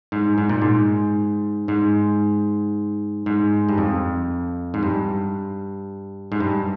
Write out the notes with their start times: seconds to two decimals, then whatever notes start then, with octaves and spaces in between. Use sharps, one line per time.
0.12 G#2
0.38 G#2
0.49 A#2
0.62 G#2
1.68 G#2
3.26 G#2
3.69 G2
3.78 F2
4.74 G#2
4.83 G2
6.32 G#2
6.40 G2